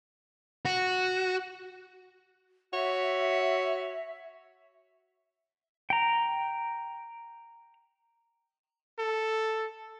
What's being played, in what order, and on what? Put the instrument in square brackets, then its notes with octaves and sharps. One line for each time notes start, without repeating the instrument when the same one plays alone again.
[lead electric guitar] F#4
[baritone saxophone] F#4 [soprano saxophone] C#5 [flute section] E5
[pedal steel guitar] G5 A#5
[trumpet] A4